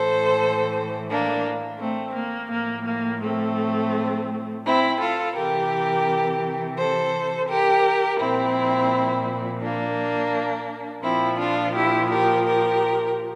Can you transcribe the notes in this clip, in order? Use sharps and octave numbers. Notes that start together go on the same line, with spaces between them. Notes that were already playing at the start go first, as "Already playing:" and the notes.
Already playing: A2 E3 A4 C5
A#3 D4
A3 C4
A#3
A2 F3 A#3
A#3
A3 C4
C4 E4
F4 A4
C3 E3 G4 A#4
A4 C5
G4 A#4
A#2 F3 C4 E4
A#3 D4
A#2 F3 C4 E4
D4 F4
E4 G4
G4 A#4
G4 A#4